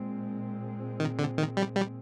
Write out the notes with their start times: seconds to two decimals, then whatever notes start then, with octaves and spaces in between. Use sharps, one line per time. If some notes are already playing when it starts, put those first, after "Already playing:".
Already playing: A#2 G#3 C4
1.00 D#3
1.19 D3
1.38 D#3
1.57 G3
1.76 G3